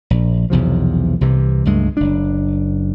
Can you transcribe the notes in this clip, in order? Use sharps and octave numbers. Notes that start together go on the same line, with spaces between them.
A#1
B1 E2 C3 F3
C2 C3 E3
C#2 G2 G#3 A3
F#1 D4